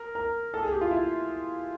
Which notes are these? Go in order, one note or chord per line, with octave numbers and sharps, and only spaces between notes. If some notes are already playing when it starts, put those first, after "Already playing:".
Already playing: A#4
A#4
A4
G#4
G4
F4
E4